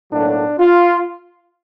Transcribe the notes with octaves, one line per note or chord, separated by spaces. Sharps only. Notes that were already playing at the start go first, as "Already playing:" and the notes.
B1 A2 F#3 A#3 D4
F4